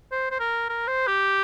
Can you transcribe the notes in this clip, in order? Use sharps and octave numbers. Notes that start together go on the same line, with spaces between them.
C5
C5
A#4
A#4
C5
G4